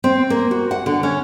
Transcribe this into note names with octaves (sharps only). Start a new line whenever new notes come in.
C4
A#3
F#4
F#5
D3
C#4